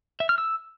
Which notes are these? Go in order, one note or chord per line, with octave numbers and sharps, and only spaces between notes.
E5
F6
E6